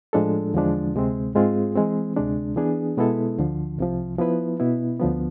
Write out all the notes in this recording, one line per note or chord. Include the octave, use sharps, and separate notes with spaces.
A2 F3 G#3 D4 A4
E2 D3 F3 G#3 D4
D2 C3 G#3 C4
G#2 G#3 C4 F4 G#4
E3 G#3 C4
D2 C3 G#3 D4
E3 B3 D4 G#4
B2 G#3 B3 E4 A4
D2 D3 F3
C2 C3 F3
F3 B3 E4 B4
B2 B3 E4
D2 D3 F3 B3